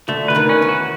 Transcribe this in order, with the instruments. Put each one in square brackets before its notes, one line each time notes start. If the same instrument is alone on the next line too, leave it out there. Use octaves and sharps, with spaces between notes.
[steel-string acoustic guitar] D2 D3 [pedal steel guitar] A3
[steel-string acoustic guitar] E3 [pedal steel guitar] B4
[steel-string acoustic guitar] D#2 D#3
[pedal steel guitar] C#4
[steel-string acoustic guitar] E2 E3
[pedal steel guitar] F#4